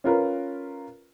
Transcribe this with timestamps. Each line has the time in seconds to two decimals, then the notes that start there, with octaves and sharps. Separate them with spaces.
0.04 C#4 F4 A#4 B4